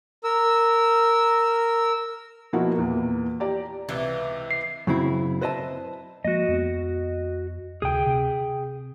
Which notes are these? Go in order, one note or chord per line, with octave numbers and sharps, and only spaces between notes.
A#4 E6
B2 F3 A#3 E4 F#4
E2 A#2 A#3
G4 D5 A#5
C#2 C3 E3
C7
F#2 C#3 C4 E4
B4 C5 D#5 E5 A5
F3 G#3 A#3 F#4 D#5
F2 B3
D2 C3 G#4 G5
C3